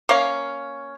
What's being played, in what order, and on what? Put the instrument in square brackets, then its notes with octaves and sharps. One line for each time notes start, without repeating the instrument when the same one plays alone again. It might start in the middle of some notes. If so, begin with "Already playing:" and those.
[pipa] A#3 C#4 F5